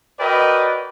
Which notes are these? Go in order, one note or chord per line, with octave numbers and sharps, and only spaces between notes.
F#4 A#4 B4 D5 D#5 G5